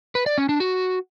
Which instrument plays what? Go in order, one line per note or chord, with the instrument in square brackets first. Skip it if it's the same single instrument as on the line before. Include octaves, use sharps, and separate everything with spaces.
[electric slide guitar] B4
D5
C#4
D4
F#4